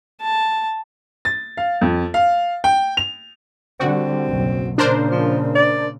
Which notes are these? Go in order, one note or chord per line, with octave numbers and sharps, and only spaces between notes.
A5
A6
F5
F2
F5
G5
F7
D3 G3 C4 F#4
F#1 B1
A#2 C#3 D4 A#4 C5
F3
D5